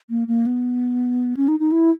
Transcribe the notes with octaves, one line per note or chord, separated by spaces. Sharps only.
A#3
A#3
B3
C#4
D#4
D#4
E4